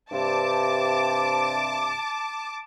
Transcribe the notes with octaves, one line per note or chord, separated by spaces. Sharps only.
G2 C3 A5 D6